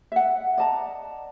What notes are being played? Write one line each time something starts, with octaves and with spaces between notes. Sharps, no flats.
E5 F#5
D5 D#5 A5 A#5